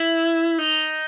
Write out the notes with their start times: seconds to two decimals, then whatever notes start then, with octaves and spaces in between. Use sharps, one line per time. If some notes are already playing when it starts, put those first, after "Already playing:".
Already playing: E4
0.58 D#4